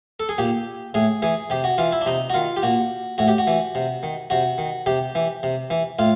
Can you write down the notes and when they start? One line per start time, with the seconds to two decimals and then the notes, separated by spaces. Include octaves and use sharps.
0.20 A4
0.29 G#4
0.38 A#2 G4
0.94 A2 G#4
1.22 E3 G#4
1.50 C3 G4
1.64 F#4
1.78 E3 F4
1.92 E4
2.01 D4
2.06 C3 D#4
2.30 F#4
2.34 D#3 F4
2.57 G4
2.63 A#2 F#4
3.18 A2 F#4
3.28 G4
3.38 F#4
3.47 E3
3.75 C3
4.03 D#3
4.30 C3 F#4
4.58 D#3
4.86 C3 G4
5.15 E3
5.43 C3
5.70 E3
5.99 A2 F4